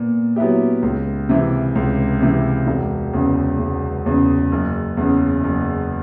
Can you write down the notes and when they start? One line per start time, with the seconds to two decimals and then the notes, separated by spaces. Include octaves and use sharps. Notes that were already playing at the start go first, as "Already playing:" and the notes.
Already playing: A#2 B3
0.36 F#3 B3 E4 G4
0.82 C#2
1.29 C3 E3
1.75 C#2
2.21 C3 E3
2.67 E1
3.13 E2 C#3
3.60 E1
4.06 E2 C#3
4.52 F#1
4.97 E2 C#3
5.44 F#1